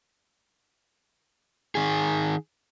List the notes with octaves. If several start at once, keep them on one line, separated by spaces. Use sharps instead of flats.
D#3 G#4